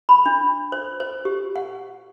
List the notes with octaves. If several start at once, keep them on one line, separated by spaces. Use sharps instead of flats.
B5
D4
C5
C5
G4
F#5